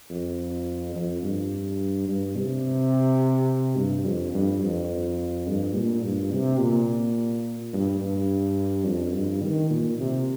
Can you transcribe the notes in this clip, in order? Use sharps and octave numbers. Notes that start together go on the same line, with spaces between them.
F2
F2
G2
G2
C3
G2
F2
G2
F2
G2
A#2
G2
C3
A#2
G2
G2
F2
G2
D#3
A#2
C3